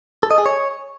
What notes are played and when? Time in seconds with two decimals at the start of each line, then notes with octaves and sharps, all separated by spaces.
0.23 A4
0.31 D#5
0.38 G#4
0.46 C#5